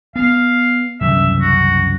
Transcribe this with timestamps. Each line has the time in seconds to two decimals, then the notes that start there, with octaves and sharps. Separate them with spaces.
0.16 B3 F5
1.01 C2 F#2 C#3 E5
1.41 F#4